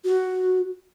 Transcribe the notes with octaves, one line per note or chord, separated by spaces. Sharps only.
F#4